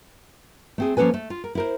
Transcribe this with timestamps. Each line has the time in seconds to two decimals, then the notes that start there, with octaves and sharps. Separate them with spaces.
0.78 A3 C4 G#4
0.97 F3 A#3 C#4 A4 B4 G#5
1.14 A3
1.30 F4
1.44 A#4
1.55 E4 A#4 C5